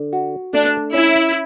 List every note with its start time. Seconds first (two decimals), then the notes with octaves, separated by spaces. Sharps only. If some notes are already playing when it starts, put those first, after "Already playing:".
Already playing: D3
0.13 F#4
0.53 A3 D4
0.94 C#4 E4